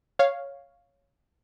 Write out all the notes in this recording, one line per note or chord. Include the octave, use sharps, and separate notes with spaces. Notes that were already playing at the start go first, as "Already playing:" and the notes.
C#5 F5